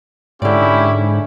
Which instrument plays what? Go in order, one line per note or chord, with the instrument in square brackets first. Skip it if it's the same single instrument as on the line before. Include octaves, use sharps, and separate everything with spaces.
[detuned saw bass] G#2 [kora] D3 D5 [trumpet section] C#4 E4 G4